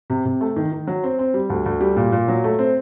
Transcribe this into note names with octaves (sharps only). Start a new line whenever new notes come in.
C3
C3
A3
D#3
D#3
F#3
C4
C4
G3
D2
D2
G3
A#2
A#2
F#3
A3
C4